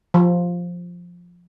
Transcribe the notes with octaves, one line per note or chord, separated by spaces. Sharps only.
F3